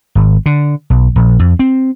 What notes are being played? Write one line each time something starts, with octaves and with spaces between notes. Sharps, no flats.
G#1
D3
B1
A#1
F2
C4